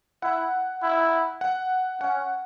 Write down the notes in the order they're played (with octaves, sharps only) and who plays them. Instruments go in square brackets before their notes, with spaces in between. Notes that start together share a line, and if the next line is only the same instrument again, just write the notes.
[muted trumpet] E4 [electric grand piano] F#5
[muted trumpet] E4
[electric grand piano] F#5
[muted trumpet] C#4 [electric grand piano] F#5